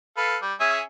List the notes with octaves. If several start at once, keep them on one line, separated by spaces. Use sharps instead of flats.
A4 B4 F5
G3
C#4 G#4 E5